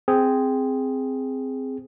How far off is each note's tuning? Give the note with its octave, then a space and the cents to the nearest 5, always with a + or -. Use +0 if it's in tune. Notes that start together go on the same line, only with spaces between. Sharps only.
C4 -5 G#4 +0